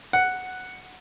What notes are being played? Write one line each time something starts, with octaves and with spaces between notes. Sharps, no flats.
F#5